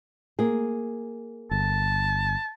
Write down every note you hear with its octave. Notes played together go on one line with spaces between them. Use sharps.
A#3 G#4
G1 A5